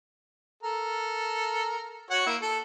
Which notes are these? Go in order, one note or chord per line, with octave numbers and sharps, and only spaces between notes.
A4 A#4
F#4 C#5 F#5
A#3 E4
A4